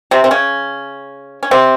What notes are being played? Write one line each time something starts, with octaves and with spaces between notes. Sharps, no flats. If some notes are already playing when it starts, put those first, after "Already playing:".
C3 C4
C4
C#3 C#4
C#4
C3 C4